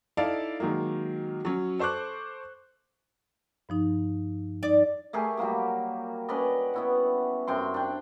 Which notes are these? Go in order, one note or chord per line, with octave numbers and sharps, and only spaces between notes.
D#4 E4 A4 D5 F5
D#3 F#3 G#3 A#3
F#3 C#4
A4 C5 C#6 D6 F#6
G2 F3 D#4
D#4 D5
A3 G4 G#4 A#4
F#3 G3 A#3 G4
C#4 B4 D5 D#5
B3 E4 F#4
F#2 C3 G5 C6
D4 G5